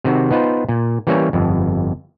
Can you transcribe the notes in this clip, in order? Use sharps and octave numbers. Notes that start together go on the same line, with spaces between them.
C3 D#3 C4 F#4
B3 D#4 F4 B4 C5
A#2
E3 G3 A#3 C#4 C#5
G1 F2